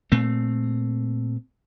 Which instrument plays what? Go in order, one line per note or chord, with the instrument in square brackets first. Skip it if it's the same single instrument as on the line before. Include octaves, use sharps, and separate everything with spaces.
[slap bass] A#2 A3 C4